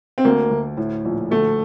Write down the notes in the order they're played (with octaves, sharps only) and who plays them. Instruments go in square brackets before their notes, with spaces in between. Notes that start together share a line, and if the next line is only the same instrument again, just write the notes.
[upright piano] C4
[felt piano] D2 [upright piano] A#3
[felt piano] D2
A2
A#1
[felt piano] D2 [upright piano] A3